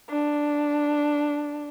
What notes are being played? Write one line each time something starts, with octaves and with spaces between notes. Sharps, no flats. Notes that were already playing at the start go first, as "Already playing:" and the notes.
D4